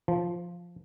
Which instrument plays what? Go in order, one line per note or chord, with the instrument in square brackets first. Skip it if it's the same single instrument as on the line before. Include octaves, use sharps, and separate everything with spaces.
[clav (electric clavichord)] F3